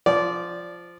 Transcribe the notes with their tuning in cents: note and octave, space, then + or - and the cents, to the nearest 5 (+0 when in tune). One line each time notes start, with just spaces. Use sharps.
F3 -10 D5 -15